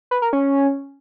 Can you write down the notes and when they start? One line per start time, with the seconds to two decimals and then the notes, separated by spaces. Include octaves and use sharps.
0.11 B4
0.22 A#4
0.33 C#4